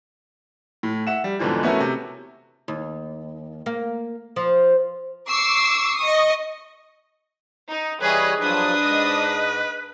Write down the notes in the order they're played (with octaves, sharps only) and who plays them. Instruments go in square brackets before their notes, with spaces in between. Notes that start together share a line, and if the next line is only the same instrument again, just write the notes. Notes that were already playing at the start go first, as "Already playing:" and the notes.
[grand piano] A2
E5 F#5 E7
G3
E2 G#2 B2 D3 E3 F3
A3 B3 C#4 E4 F#4 A#4
C3
[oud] D#2
A#3
F3
[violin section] C#6 D6 E6 C7
D#5 C#6 D#6
[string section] D#4
[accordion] E3 G3 C#5 [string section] G#4 D#5 [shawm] B4
[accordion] G2 F3 F#3 [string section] D4 D#6 [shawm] B4
[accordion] G#2 D#5